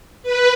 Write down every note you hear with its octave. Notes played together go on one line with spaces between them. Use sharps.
B4